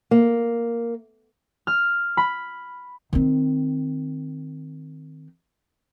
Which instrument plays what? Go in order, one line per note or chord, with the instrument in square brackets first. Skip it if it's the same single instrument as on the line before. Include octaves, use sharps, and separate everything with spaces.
[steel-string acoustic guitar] A#3
[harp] F6
B5
[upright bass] D#3 C4